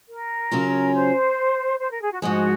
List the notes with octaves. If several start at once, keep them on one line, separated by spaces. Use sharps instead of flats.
A#4
C#3 F#3 C#4 F4
C5
C5
A#4
G#4
F#4
G#2 F3 G#3 F#4